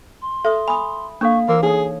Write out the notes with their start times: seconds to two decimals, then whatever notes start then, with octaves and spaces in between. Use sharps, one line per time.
0.22 C6
0.45 A4 E5 D#6
0.68 G#5 B5 D#6
1.21 A#3 D4 A4 F5 C#6
1.49 E3 A#3 E6
1.63 D#4 G#4 A4 C#5